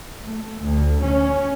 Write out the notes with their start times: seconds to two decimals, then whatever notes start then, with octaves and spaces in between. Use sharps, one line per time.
0.24 A3
0.61 D2
1.04 C#4